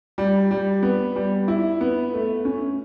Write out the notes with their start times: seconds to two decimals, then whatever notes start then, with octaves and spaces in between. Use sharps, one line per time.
0.18 G3
0.51 G3
0.83 B3
1.16 G3
1.48 E4
1.81 B3
2.14 A3
2.45 C#4